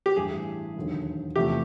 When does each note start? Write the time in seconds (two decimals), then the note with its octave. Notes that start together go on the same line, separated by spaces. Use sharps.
0.06 G4
0.16 A1 G2 E3 G#4
0.76 E1 D#2 D3 F#3
1.36 E2 C3 F3 A3 G4